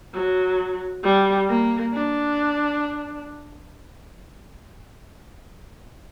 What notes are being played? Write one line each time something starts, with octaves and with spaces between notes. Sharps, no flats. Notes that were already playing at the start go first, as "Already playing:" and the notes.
F#3
G3
A#3
D4